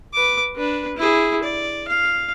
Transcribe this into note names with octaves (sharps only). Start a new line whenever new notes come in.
B4 D6
D4 B4
E4 G#4
D5
F5